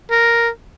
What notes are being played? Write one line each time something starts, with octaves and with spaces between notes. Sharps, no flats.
A#4